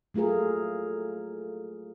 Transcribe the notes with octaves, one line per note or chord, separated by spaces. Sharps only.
F#3 A3 F4 G#4 A#4